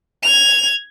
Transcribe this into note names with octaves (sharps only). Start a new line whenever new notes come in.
G#6 F7